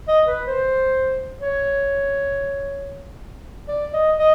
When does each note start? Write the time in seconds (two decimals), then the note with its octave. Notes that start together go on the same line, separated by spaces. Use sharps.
0.08 D#5
0.27 B4
0.47 C5
1.41 C#5
3.68 D5
3.93 D#5
4.19 D#5